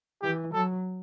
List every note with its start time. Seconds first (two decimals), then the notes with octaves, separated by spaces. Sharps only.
0.22 E3 G4
0.53 F#3 A4